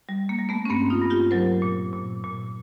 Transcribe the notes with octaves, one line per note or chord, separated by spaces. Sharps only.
G3
A#3
G3
A3 B3
C#4
G2 A#3 C4
D#4 F4
G2
F4 G4
F#3 A#4 C5
A#2
A#2
A#2